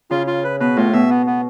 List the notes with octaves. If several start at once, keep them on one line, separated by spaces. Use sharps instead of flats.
C#3 F4
F4
B4
B2 B4
A2 F4
B2 E5
B3
B3